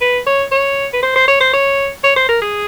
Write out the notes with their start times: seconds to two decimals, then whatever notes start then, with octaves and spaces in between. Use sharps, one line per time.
0.01 B4
0.26 C#5
0.52 C#5
0.93 B4
1.03 C5
1.15 C5
1.28 C#5
1.40 C5
1.53 C#5
2.04 C#5
2.16 C5
2.29 A#4
2.42 G#4